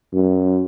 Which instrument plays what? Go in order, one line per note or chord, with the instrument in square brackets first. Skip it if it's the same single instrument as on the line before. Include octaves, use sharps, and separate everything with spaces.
[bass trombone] F#2